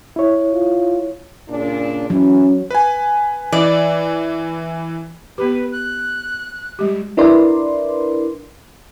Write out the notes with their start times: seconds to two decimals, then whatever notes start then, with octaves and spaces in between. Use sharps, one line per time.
0.16 E4 C#5
0.54 F4
1.49 A#2 C#3 D4
2.10 E3 F#3 C#4
2.71 B4 G#5
3.52 E3 D5
5.38 B3 G4 B4
5.72 F#6
6.79 G3 G#3 G4
7.17 D4 E4 A#4 B4 D5 C6